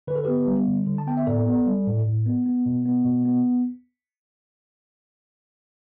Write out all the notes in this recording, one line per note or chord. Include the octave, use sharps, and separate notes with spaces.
D3 B4
A4
B3 G4 B4
G3
D3
D3
A5
B3 G5
E5
A2 A4 D5
B3
G3
A2
A2
B3
B3
B2
B3
B2
B3